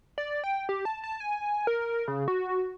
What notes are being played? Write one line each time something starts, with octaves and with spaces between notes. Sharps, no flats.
D5
G5
G4
A5
A5
G#5
A#4
C#3
F#4